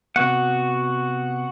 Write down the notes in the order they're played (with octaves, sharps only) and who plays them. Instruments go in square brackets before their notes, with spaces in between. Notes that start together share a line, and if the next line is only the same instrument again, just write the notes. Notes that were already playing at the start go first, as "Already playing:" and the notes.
[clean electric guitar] C3 B3 [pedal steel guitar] F#4 F#5